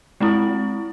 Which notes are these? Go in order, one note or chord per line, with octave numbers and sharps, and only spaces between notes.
G#3 C4 E4